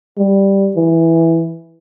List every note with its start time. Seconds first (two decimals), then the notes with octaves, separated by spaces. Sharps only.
0.18 G3
0.76 E3